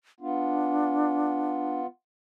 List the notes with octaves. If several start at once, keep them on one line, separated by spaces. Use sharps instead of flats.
B3 D4 F4